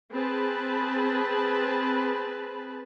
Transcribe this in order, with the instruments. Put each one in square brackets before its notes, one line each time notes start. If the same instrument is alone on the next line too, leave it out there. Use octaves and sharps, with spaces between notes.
[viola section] C4 G#4 B4 A5 B5